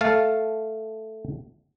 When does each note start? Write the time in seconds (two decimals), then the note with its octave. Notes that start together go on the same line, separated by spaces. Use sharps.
0.01 A3 F5 A5